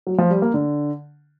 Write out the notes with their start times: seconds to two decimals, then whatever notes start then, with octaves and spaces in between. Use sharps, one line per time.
0.07 F#3
0.18 F3
0.30 G3
0.42 A#3
0.54 D3